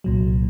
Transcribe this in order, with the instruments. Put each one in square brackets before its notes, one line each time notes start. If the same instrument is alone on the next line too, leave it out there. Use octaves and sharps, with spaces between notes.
[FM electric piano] C2 A#2 F#3